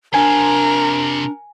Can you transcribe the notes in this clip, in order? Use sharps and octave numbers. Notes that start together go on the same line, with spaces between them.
C3 D4 F4 A#4 G#5